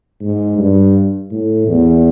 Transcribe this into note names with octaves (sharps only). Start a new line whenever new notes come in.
G#2
G2
A2
E2